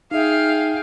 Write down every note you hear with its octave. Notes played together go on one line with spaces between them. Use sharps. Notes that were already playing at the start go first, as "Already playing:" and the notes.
D#4 G#4 E5 F5 G5